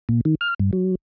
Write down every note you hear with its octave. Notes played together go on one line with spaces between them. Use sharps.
A#2
D#3
F6
G2
F#3